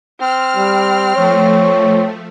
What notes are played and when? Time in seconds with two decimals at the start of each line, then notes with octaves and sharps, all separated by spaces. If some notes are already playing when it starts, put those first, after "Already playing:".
0.19 C4 F6
0.56 G3
1.16 F3 A3 C#5